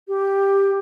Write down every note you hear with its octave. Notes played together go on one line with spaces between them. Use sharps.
G4